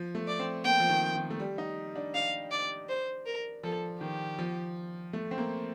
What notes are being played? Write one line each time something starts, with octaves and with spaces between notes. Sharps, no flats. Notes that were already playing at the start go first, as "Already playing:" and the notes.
Already playing: F3
A3
D5
C4
A#3 G5
F3
D#3
D#3
A3
G3
D#4
D4
D4 F5
D5
C5
A#4
F3 A4
D#3 G4
F3
A3
C4
A#3